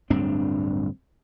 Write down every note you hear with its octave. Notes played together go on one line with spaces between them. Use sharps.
D1 G2 C4 D4